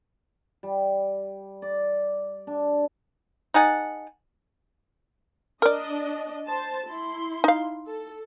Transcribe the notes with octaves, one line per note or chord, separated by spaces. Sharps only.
G3
D5
D4
D#4 G#4 F#5 A5
D4 A#4 D5 D#5
C5 A5
E4 C6
D#4 F5
A4